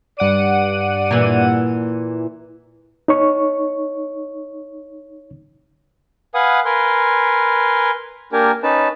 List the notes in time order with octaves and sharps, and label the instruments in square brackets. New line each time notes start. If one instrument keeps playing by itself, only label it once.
[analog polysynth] G2 F#5 D#7 [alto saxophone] D5
[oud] A#2 E3
[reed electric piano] D#4 C#5 C#6
[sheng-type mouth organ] B4 F5 F#5 G#5 D#6
A#4 B4 G#5 C6
A#3 D4 G4 A#4 G#5
C#4 D#4 B4 A5